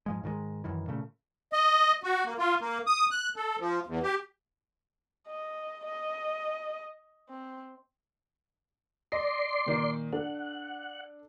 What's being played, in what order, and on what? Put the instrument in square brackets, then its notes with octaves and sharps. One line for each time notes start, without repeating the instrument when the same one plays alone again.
[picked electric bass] G#2 F3 G#3
G#2 D#3 E3 G#3
F#2 D#3 E3
A#2 C#3 A3
[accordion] D#5
F#4
A#3
F4
A#3
D#6
F#6
A4
F3
E2
G4
[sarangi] D#5
D#5
C4
[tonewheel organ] D5 C6 [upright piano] D#5
[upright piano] A#2 D#3 D#4
[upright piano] D4 A4 [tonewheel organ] F#5